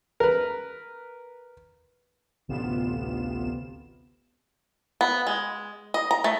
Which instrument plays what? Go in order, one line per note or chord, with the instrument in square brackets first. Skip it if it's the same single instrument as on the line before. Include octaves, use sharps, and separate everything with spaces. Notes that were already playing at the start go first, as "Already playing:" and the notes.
[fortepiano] A#4 B4
[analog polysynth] A1 D2 C3 B3 F4 E7
[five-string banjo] B3
G#3
D#5
A#5
A3